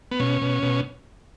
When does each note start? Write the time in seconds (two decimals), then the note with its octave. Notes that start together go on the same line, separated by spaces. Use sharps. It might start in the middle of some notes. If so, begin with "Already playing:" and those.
0.12 B3
0.20 B2 C#4
0.42 B2
0.63 B2